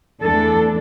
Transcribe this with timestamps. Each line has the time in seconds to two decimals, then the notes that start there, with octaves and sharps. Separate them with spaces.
0.22 E2 E3 A3 D4 A4